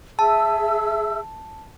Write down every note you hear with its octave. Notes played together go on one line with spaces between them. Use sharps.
G#4 E5 A5 E6